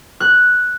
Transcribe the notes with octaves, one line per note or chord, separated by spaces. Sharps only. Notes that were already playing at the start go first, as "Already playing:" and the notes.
F#6